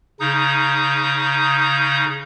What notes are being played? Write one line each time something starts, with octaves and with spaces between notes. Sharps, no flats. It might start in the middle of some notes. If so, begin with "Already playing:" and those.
C#3 D#4 D#6 G6